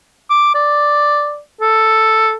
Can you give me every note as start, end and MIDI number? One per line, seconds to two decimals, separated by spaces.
0.30 0.51 86
0.54 1.39 74
1.61 2.35 69